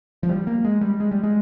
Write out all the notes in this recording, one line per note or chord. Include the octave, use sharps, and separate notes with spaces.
F3
G3
A#3
G#3
G3
G#3
G3
G#3